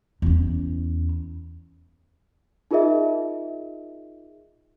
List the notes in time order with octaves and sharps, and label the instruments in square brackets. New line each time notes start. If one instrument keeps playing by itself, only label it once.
[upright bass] E2 C#4
[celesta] D#4 F4 G#4 A#4 D#5 E5